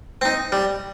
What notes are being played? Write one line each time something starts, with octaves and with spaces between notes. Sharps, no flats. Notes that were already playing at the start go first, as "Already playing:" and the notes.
C4 D#4
G3